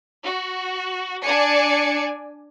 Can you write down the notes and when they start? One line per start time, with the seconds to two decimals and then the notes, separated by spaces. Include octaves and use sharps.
0.23 F#4
1.22 D4 D5 G#5 C#7